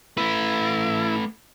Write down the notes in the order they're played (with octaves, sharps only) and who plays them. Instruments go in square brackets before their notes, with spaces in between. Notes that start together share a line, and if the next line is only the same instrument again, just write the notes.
[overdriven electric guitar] A3 B4 [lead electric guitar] E4